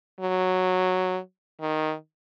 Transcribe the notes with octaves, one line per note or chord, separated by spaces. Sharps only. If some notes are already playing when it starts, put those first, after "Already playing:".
F#3
D#3